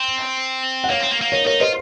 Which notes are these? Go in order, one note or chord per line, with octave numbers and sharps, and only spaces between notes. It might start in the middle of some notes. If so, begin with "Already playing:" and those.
Already playing: C4
F#5
A#3 C#5 F5
C4
A#3
A#3
D#4 A#4 C#5
D#4 A#4 C#5
F4 C5 D#5